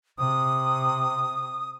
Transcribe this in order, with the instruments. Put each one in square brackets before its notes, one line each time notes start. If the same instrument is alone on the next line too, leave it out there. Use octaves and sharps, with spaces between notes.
[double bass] C3 [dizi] D#6